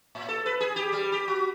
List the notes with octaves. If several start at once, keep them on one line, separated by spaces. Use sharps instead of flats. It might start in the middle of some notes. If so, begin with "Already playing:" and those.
A2
A4
B4
G#4
G4
G3
G4
F#4